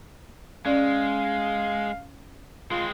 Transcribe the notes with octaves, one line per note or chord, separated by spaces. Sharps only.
G#3 C#4 D5 F5
G#3 C4 F4